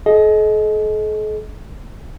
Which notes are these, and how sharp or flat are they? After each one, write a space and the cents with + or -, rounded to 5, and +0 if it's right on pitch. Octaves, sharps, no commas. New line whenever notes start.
A4 -45 D#5 +10